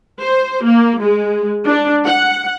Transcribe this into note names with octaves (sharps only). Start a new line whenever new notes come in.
C5
A#3
G#3
D4
F#5